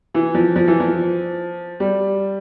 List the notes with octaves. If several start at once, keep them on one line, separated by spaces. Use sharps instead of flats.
E3
F3
F3
E3
F3
G3